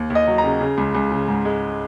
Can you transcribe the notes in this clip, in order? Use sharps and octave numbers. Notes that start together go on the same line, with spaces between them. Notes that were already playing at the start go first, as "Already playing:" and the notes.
Already playing: D#2
D#2
D#5
F#3
A#5
C#3
C#3
C#2
C#2
C#3
G#2
G#3